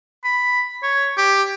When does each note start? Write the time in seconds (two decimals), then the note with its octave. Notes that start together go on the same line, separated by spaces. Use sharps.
0.24 B5
0.83 C#5
1.17 G4